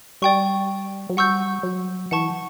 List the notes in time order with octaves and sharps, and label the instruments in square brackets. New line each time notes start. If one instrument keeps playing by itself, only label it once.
[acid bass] G3 [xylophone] D5 G5 C#6
[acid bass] F#3
[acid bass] G3 [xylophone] F#5 C#6 E6 G6
[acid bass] F#3
[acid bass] E3 [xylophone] F#5 A5 C#6